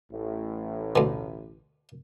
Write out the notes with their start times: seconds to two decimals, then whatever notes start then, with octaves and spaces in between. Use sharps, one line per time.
0.11 A1 A2
0.96 D2 B2